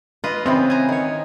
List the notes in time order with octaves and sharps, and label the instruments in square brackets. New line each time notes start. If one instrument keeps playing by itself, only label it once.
[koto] F4 B4 D#5
[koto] C#3 E3 B3 [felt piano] C4
[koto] G#5 A#5
D#3 C#5